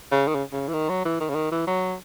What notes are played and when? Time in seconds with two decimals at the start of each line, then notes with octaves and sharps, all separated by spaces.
0.11 C#3
0.28 D#3
0.35 C#3
0.52 C#3
0.68 E3
0.73 D#3
0.89 F#3
1.05 E3
1.20 D#3
1.29 C#3
1.35 D#3
1.51 E3
1.67 F#3